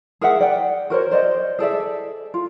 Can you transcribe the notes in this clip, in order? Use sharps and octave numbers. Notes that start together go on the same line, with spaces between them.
G#4 A#4 E5 F#5
D5 G5
F#4 A#4 C5 C#5
C5 D5 D#5
G#4 A4 D5 E5
F4